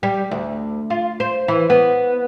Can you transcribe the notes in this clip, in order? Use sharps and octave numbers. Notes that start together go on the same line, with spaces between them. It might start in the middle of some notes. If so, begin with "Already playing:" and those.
G3
D2
F4
C5
E3
B3